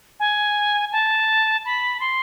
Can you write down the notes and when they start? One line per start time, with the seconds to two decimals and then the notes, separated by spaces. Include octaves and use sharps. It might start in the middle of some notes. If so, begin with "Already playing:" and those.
0.20 G#5
0.92 A5
1.65 B5
2.00 C6